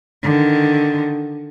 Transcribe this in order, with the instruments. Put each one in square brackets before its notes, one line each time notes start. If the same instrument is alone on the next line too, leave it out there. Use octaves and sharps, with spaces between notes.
[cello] D3 D#3